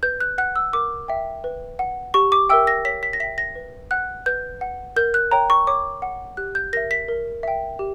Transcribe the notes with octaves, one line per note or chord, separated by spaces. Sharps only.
B4 G6
F#6
F#5 F#6
E6
A#4 D6
E5 G5
B4
F#5
G4 C#6
D6
A#4 E5 G5 E6
A#6
C#5 B6
B6
A#6
E5 G5 B6
A#6
B4
F#5 F#6
B4 G6
F#5
A#4 G6
F#6
C#5 G5 A#5
C#6
C#5 D6
F#5
G4 F#6
G6
A#4 E5 A#6
B6
A#4
E5 G5
G4